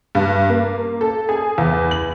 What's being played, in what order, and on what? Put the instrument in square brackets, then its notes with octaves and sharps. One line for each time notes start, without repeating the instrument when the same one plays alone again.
[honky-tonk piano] G2
A#3
A4
G#4
E2
F#7